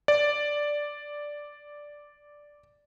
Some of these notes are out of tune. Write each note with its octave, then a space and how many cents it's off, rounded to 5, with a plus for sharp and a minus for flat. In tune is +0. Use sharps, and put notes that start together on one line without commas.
D5 +0